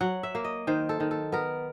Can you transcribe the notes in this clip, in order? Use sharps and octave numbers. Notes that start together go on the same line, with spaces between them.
F#3 F#5
E5
A#3
D#5
D#3 C5
A4
D#3
A4
B3 A#4